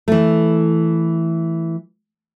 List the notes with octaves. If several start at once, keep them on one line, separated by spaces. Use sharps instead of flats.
E3 A3